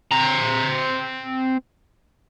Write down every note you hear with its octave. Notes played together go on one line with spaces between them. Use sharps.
C4 A#5